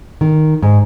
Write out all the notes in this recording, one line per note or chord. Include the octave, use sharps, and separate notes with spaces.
D#3
G#2